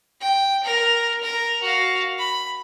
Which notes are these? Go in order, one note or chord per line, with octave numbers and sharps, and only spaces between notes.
G5
A#4
A#4
F#4 F5
B5